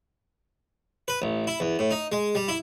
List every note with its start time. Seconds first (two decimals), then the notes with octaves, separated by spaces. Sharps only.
1.08 B4
1.22 A1
1.47 E4
1.60 E2
1.79 A2
1.91 D#4
2.12 G#3
2.35 G3
2.48 E4